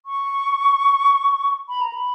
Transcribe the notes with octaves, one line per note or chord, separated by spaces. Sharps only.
C#6
B5
A#5
B5